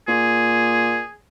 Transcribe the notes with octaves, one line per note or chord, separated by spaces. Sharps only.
A#2 G#4